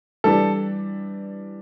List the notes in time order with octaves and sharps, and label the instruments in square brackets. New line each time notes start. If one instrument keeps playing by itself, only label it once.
[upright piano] E3 G3 D4 G4 [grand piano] A4